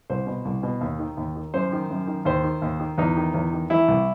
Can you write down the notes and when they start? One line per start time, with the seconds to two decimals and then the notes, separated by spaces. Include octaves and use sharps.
0.10 C2 C5
0.26 B2
0.45 C2
0.63 B2
0.81 D#2
0.99 D#3
1.17 D#2
1.36 D#3
1.54 F#2 C5
1.72 D#3
1.90 F#2
2.07 D#3
2.25 D#2 C5
2.44 D#3
2.62 D#2
2.80 D#3
2.98 E2 D#4
3.16 D#3
3.34 E2
3.53 D#3
3.70 E3 E4
3.88 C2